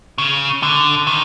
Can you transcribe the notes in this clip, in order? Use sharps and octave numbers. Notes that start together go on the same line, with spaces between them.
C#3
D3
D#3